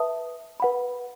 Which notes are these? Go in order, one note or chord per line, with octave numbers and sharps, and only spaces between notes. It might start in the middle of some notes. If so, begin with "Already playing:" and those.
Already playing: B4 E5 A5 D#6
B4 F#5 B5